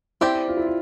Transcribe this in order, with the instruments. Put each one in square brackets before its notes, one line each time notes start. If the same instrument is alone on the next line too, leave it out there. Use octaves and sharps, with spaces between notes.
[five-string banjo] C4 G4 D5 [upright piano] E4
[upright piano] F4
E4
F4